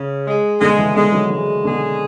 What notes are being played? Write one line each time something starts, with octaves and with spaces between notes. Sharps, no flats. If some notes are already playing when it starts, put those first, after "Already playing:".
Already playing: C#3
G#3
B2 D3 G#3
C#3 E3
B2 D3 G#3
D3 F#3
C#3 E3 G#3
B2 D3 G#4